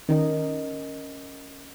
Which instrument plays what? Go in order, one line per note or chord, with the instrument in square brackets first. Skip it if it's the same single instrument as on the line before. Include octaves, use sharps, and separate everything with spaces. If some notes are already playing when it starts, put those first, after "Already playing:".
[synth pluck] D#3 [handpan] C#4 A#4 D#5